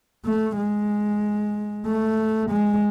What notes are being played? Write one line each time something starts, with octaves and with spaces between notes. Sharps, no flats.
A3
G#3
A3
G#3